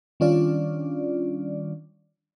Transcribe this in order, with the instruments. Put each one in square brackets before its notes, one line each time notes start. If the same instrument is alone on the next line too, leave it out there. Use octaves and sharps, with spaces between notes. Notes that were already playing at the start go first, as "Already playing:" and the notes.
[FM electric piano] D#3 G3 C#4 D4 F4 D5